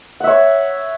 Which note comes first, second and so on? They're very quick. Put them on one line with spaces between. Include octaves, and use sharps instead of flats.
F#5 E5 C#5